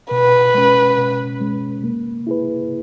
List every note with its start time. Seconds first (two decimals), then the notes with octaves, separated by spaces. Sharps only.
0.11 B2 B4
0.54 G#3 C#4
0.98 B2
1.40 G#3 C#4
1.84 A#3
2.27 E4 G#4 B4